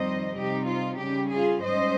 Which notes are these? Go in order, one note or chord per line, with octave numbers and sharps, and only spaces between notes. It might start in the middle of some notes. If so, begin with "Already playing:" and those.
Already playing: F2 D#3 G3 C4 D#4 C5 D#5
C3 G3 C4 D#4 G4
F4
C#3 G3 C#4 G4
F4 G#4
G#2 G3 C#4 C5 D#5